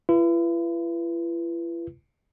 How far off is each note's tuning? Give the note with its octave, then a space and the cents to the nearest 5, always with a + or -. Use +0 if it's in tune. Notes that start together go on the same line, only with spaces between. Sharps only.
E4 +45 B4 -5